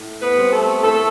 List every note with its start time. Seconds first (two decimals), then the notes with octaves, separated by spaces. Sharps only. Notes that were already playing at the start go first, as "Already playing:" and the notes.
Already playing: A2
0.21 B3 B4
0.37 G3 C4
0.52 A3 A4
0.82 A2 A3 A4